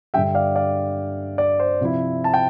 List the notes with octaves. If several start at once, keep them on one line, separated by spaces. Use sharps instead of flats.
G2 D3 G3 E5 G5
D5 F5
D5 F5
D5
C5
C3 F3 C4 E4
A5
G5